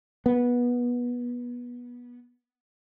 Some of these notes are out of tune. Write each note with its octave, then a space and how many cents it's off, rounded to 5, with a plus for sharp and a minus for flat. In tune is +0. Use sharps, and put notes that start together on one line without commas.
B3 -20